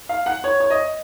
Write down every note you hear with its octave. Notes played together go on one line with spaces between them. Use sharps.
F5
F#5
C#5
C#5
D#5